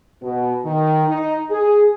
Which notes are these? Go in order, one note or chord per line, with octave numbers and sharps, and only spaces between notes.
B2
D#3
D#4
G#4